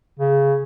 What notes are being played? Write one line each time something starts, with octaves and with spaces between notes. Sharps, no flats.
C#3